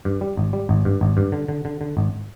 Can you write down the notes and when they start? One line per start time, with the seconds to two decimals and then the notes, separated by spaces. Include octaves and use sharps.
0.05 G2
0.21 G3
0.37 G#1
0.53 G3
0.69 G#1
0.85 G2
1.01 G#1
1.17 G2
1.32 D3
1.48 D3
1.65 D3
1.81 D3
1.97 G#1